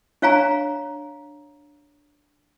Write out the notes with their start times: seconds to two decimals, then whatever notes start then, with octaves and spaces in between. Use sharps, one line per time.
0.22 D4 C#5 F5 G#5 A#5